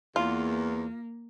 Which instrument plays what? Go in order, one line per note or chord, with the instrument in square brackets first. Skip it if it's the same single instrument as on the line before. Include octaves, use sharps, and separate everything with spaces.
[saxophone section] E2 [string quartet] A#3 [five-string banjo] F4